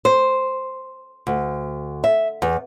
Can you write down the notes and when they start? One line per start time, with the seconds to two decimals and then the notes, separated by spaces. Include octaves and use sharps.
0.05 C5
1.27 D2
2.04 E5
2.42 E2